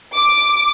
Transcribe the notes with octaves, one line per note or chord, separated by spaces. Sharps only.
D6